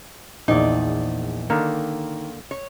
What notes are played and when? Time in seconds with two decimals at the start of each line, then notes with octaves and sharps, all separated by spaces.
0.48 A#1 E2 D#4 D5
1.50 D3 D#3 A#3
2.51 C#5